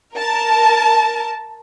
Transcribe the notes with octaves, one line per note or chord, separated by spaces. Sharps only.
A#4 A5